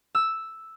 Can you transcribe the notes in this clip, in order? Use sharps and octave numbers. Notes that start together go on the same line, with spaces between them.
E6